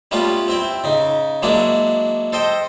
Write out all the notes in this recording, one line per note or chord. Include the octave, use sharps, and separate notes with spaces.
G3 A3 B3 C#4 F4
C4 E4 G5
C#3 D#4
F#3 G#3 A#3 D4 E4
A4 C5 D#5 G5